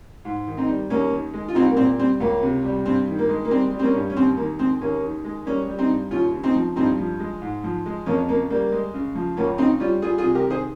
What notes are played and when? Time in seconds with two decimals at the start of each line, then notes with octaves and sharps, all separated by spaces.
0.25 G#2
0.47 D#3
0.57 C4 D#4
0.68 G3
0.90 D#2 A#3 C#4
1.13 D#3
1.34 G#3
1.48 F4
1.55 C2 C4 D#4
1.70 A#3
1.77 A#2 C4
1.98 G3 C4
2.20 C#2 A#3
2.43 C3
2.64 G3
2.86 G2 C4
3.08 D#3
3.18 A#3
3.29 G#3
3.45 A#3
3.51 G3 C4
3.72 G3
3.79 C4
3.83 A#3 C#4
3.95 G2
4.10 C#4
4.16 D#2 C4
4.37 D#3 A#3
4.59 G#3 C4
4.81 D#2 A#3 C#4
5.03 D#3
5.24 G#3
5.46 G3 A#3 C#4
5.68 G3
5.78 C4 D#4
5.90 G2
6.11 D#2 C#4 F4
6.32 C#3
6.43 C4 D#4
6.55 F3
6.76 G2 C4 D#4
6.98 F3
7.20 G#3
7.42 G#2
7.64 F3
7.86 G#3
8.06 F2 A#3 C#4
8.29 C#3 A#3
8.50 G3 A#3
8.72 G#3
8.94 C#3
9.15 F3
9.37 C#2 A#3 C#4
9.58 C#3 C4 D#4
9.80 G3 C#4 F4
10.02 G3 F4 G#4
10.18 F4 G#4
10.23 C3
10.35 G4 A#4
10.45 D#3
10.50 G#4 C5